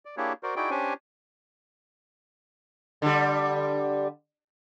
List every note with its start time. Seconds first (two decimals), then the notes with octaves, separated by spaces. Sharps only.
0.05 D5
0.17 A#3 D4 E4 G4 G#4 C#5
0.43 F#4 A#4 C5 D5
0.56 D#4 E4 F#4 G#4 D5 G5
0.71 C#4 D4 G4 C5 C#5 G#5
3.02 D3 G3